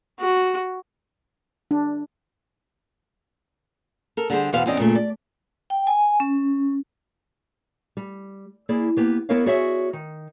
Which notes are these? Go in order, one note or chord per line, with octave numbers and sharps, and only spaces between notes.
F#4
D4
A4 A#4
D3 G3 G#4 C5
E2 B2 E3 B3 C5 F5
E2 C4 C#4 D5 D#5
A#2 C#3 A3
D5
G5
G#5
C#4
G3
A#3 E4 G#4 D5
A#3 B3 G4
B3 E4 A#4 C#5 D#5 F5
F#4 G#4 C#5 D5 E5
D#3